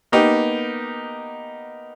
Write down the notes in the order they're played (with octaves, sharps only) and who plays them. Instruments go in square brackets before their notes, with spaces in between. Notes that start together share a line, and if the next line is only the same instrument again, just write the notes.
[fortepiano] A#3 B3 D#4 G4